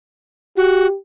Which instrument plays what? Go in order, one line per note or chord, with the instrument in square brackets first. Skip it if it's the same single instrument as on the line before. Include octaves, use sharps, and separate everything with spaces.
[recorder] F#4 [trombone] G4